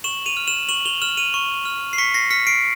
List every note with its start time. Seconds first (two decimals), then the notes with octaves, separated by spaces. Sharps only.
0.04 C#6 E7 F#7
0.26 D#7 F7
0.37 F6
0.47 E7 F#7
0.69 C#6 E7 F#7
0.85 F7 G7
1.02 F6 E7 F#7
1.17 D#7 F7
1.34 C#6
1.65 F6
1.93 C7
1.98 C#6 B6 C#7
2.14 A#6 C7
2.30 F6 B6 C#7
2.47 C7 D7